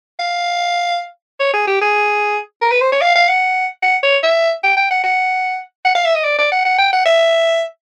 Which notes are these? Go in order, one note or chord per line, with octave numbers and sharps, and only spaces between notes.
F5
C#5
G#4
G4
G#4
A#4
B4
C5
C#5
F5
F5
F#5
F#5
C#5
E5
G5
G5
F#5
F#5
F#5
F5
E5
D#5
D5
D5
F#5
F#5
G5
F#5
E5